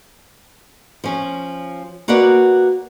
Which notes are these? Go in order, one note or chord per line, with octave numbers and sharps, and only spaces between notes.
F3 C#4
A#3 F#4 A#4 B4 D5 F#5